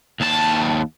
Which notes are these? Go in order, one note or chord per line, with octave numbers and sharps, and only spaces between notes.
D#2 A5